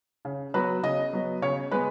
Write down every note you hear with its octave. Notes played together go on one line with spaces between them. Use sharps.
C#3
F#3 B3 B4
C#3 D#5
F#3 B3
C#3 C#5
G#3 B3 B4